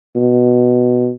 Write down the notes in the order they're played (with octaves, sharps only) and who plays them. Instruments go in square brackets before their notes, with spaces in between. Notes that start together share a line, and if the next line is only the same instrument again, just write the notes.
[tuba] B2